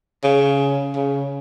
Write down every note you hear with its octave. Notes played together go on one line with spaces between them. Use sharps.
C#3
C#3